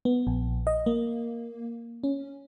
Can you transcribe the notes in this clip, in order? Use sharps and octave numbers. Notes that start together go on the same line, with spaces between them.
B3
A#1
D#5
A#3
C#4